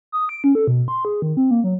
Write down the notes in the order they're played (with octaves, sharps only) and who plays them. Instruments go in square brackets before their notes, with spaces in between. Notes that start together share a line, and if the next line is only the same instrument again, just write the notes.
[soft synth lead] D#6
D7
C#4
A4
B2
C6
G#4
D#3
C4
A#3
F#3